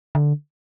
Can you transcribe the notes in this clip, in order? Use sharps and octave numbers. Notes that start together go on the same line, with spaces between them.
D3